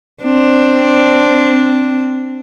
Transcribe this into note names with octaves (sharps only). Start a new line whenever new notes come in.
C4 D4